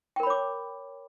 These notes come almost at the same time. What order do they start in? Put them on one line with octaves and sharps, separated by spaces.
G5 A#4 B5 C#5 D6